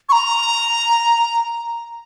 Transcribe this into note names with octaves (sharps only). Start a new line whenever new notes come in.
C#6
A#5